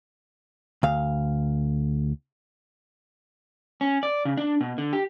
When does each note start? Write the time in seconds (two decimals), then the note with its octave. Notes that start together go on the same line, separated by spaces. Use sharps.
0.83 D2 F5
3.81 C#4
4.03 D5
4.25 C#3
4.37 D4
4.61 B2
4.78 D3
4.93 G4